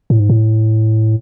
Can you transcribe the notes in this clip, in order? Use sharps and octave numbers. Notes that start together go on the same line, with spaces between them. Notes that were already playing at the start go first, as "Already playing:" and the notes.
A2
G#2
A2